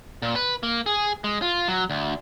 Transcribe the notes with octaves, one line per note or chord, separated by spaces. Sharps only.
A#2
B4
A#3
G#4
G#3
F4
F#3
D2